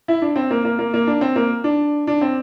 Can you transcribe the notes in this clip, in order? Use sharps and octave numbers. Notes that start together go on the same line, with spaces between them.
E4
D4
C4
A#3
A#3
A#3
A#3
D4
C4
A#3
D4
D4
C4